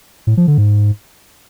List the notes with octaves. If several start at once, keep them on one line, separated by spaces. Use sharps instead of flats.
A2
F3
D3
G#2